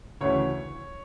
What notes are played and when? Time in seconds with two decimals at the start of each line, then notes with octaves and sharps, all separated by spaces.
0.21 D2 C#3 E3 C#5